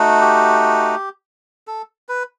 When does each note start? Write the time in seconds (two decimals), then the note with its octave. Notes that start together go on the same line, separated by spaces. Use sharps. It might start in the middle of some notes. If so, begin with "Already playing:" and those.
Already playing: A3 D#4 F#4
0.21 G4
1.67 A4
2.09 B4